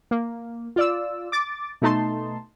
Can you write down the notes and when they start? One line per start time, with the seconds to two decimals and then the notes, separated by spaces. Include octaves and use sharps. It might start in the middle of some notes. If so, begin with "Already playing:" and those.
0.11 A#3
0.76 F4 D5 E6
1.32 D6 A6
1.82 B2 A3 D#4 A5 C6